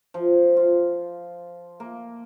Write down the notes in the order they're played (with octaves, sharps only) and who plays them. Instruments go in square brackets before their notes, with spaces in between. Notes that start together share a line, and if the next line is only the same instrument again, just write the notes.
[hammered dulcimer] F3
F4
A#3